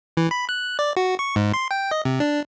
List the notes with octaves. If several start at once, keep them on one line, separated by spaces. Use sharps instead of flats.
E3
B5
F#6
D5
F#4
C#6
G#2
C6
G5
D#5
C3
D4